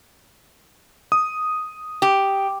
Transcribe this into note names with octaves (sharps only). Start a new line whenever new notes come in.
D#6
G4